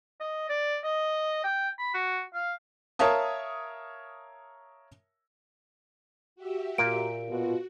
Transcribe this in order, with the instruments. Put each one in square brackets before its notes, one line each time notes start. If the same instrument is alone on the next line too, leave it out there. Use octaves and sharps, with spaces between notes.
[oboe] D#5
D5
D#5
G5
B5
F#4
F5
[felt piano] A#4 C#5 E5 F5 A5 D#6
[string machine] F#4 G4 E5
[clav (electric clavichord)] A#2 A#3 [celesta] D7
[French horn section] B2 F4 [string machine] F#4